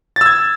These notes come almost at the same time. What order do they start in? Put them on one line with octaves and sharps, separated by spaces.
A6 E6 G#6